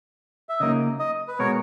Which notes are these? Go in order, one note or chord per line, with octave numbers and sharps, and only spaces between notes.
E5
C#3 F#3 A#3 D#4 D#5
D#5
B4
B2 G#3 B3 F#4 A#4 C#5